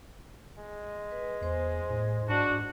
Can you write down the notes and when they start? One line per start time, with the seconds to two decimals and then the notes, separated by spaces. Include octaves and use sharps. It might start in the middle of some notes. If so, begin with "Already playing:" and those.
0.58 G#3
1.11 B4
1.41 E2 C5 C6
1.90 A2
2.29 G#2 D4 F#4